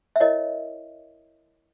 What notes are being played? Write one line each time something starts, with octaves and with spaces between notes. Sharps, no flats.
E5
E4 A#4 C#5 D#5